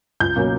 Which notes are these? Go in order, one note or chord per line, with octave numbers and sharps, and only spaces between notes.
C#2 G6
B2 F#3 A#3 C#4